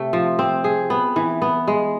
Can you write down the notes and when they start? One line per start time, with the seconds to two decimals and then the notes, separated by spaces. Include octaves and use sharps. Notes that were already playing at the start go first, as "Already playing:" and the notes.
Already playing: C3 A3
0.13 F3
0.39 C4
0.64 G#4
0.90 B3
1.16 E3
1.42 B3
1.67 G#3